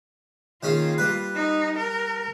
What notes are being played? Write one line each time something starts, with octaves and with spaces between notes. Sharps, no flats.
D#3 A#3 C#4 F4 G#4
G3 B4
D#4
A#4